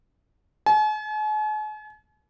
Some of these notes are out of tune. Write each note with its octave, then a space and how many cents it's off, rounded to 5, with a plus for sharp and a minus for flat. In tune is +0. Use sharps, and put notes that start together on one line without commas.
G#5 +45